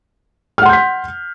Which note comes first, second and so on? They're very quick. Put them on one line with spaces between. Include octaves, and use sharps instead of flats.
F6 F#5 C6 G6 B6